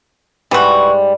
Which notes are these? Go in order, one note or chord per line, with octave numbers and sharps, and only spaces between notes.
G#2 E3 G3 F#4